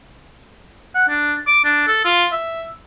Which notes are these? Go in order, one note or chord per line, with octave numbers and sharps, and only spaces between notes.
F#5
D4
D6
D4
A4
F4
E5